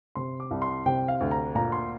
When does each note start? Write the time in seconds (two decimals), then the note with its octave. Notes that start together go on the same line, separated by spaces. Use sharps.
0.15 C3 C6
0.40 D6
0.51 C2
0.62 C6
0.86 C3 G5
1.08 F5
1.20 D2
1.31 A#5
1.55 A#2 A#5
1.72 C6